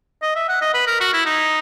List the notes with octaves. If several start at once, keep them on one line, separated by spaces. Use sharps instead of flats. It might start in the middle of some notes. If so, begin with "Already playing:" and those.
D#5
E5
F#5
D#5
B4
A#4
F#4
E4
D#4